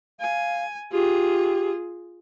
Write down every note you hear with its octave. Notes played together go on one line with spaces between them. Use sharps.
F5 G#5
F4 G4 G#4